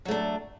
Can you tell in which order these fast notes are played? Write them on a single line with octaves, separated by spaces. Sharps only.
F#3 A3 D4